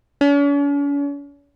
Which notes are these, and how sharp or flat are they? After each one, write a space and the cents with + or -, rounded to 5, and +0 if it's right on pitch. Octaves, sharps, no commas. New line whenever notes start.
C#4 +45